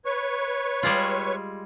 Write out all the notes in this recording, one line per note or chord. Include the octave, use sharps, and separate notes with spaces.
B4 C#5 C#6
G3 G#3 F4